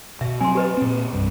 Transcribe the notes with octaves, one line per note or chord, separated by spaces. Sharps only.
B2 E5
F#3 C4 G#5 C6
G4 B4 D#5
A#2 C4
C2 G2